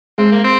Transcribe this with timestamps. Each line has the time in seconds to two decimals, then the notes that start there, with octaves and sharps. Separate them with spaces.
0.18 G#3 C4 G#4
0.32 A#3
0.44 C4